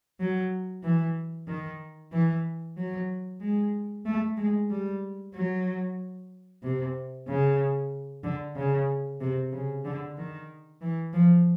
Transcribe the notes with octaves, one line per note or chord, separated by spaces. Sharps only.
F#3
E3
D#3
E3
F#3
G#3
A3
G#3
G3
F#3
C3
C#3
D3
C#3
C3
C#3
D3
D#3
E3
F3